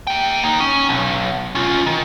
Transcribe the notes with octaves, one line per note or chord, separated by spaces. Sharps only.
A#3 G5
A#3 D#4
C#4
B1
C#4 F4
D#3